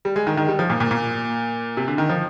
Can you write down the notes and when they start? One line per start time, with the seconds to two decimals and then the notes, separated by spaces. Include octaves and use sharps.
0.05 G3
0.16 G#3
0.27 D#3
0.37 D#3
0.48 G3
0.59 F3
0.70 A#2
0.80 A#2
0.91 A#2
1.77 C3
1.88 D3
1.98 D#3
2.10 F3